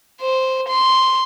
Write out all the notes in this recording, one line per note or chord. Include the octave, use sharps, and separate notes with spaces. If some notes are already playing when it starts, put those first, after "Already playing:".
C5
C6